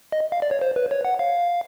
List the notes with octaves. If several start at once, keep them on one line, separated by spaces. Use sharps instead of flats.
D#5
F5
D5
C#5
C5
B4
C#5
F#5
F5